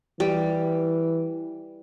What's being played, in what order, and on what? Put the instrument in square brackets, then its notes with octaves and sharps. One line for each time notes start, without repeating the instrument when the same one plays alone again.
[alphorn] E3 [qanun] G3